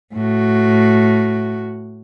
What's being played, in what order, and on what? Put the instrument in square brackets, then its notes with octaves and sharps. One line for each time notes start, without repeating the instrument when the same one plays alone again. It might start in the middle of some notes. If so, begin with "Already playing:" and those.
[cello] A2 F#4